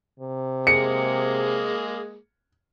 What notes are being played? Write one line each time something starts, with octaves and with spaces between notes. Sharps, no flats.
C3
G#3 A#3 G#4 C#7